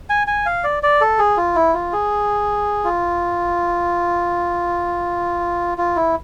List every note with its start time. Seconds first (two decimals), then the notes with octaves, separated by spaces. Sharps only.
0.10 G#5
0.27 G#5
0.46 F5
0.64 D5
0.83 D5
1.01 A4
1.19 G#4
1.37 F4
1.55 E4
1.74 F4
1.93 G#4
2.84 F4
5.78 F4
5.96 E4